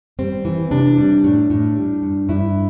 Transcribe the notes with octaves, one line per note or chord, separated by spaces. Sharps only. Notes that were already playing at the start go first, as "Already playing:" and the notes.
G3 C4
E3
C3 D4
G3
A2
A2
G3
G2
G2 E4